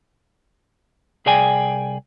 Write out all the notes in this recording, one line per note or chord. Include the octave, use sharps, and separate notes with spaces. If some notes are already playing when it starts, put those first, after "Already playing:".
C2 G#4 D5 G5 G#5